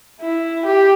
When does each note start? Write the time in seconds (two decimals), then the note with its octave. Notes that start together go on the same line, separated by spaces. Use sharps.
0.21 E4
0.65 G4